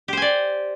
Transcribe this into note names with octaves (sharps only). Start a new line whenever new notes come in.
G4 C5 D5 G#5